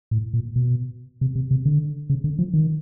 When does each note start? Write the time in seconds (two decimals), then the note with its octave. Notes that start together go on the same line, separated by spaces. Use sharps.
0.11 A2
0.33 A#2
0.56 B2
1.21 C3
1.35 C3
1.51 C3
1.65 D3
2.10 C#3
2.24 D3
2.39 F3
2.53 D#3